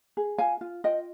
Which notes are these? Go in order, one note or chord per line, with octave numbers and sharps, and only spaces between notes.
G#4
F4 F5 G#5
F4
F4 D#5 G5